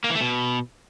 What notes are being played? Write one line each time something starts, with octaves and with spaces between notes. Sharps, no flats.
A#3
E3
A3
B2